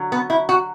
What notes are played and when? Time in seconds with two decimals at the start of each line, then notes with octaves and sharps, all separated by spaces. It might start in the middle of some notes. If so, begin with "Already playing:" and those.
Already playing: D3 F#3
0.12 B3
0.30 E4
0.49 F#4